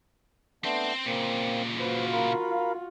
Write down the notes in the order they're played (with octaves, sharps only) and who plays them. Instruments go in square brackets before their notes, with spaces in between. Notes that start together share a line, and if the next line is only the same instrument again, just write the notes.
[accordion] A3 B3 D4 [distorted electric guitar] C4 C5
[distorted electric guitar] A#2 C#3 [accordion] A#3 C4
[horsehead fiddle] F4 F#4 [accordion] B4 C5
[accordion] A#4 F5 B5